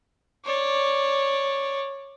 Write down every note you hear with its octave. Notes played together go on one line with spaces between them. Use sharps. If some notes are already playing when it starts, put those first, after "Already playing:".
C#5 D5